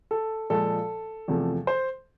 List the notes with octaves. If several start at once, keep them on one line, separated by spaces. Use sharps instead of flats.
A4
A#2 F3 G#3 A4
E2 C3 F3 A3
C5